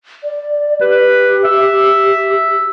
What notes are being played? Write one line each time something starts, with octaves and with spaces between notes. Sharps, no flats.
D5
G4 B4
E5